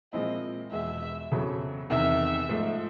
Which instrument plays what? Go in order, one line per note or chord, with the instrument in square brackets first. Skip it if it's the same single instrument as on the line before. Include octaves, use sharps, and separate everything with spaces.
[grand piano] A#2 F3 G#3 C4 E4 [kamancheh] D#5
[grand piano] E2 B2 G#3 [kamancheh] E5
[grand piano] F2 C#3 F#3 B3 E4
[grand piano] E2 C3 D#3 [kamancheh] E5
[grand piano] G#2 F3 A3